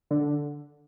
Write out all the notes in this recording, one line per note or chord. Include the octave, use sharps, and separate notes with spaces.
D3